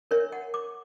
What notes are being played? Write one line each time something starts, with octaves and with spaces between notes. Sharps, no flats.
D4 A#4 C#5 E5
F#5
D6